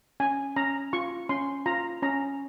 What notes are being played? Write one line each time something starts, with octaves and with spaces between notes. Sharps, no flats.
C#4 G#5
C#4 A#5
F4 C#6
C#4 C6
F4 A#5
C#4 A#5